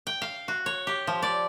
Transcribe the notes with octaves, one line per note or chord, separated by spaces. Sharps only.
G5
F5
F#4
C#5
G4
F3
D5